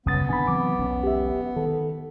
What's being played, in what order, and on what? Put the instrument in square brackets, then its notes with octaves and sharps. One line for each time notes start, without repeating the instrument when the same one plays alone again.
[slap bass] G1 F#2 F#3 [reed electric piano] C#3 D#6 A6 [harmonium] B3
[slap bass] C3 D#3 D4 [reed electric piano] G#5 B5
[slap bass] E3 F#3 C4 [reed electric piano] D6
[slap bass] E1 B1 C#4
[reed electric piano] G4 E5
[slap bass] D#3 [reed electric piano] A4